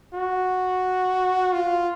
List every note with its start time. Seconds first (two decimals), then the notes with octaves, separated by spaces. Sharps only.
0.14 F#4
1.52 F4